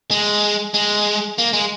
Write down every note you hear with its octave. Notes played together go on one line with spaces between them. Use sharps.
G#3
G#3
A#3
G#3